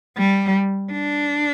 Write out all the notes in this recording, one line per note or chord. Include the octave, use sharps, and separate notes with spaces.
G3
D4